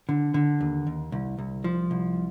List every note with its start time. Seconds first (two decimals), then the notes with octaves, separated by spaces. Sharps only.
0.09 D3
0.34 D3
0.61 D#2
0.87 D#2
1.12 C2
1.38 C2
1.64 F3
1.91 C2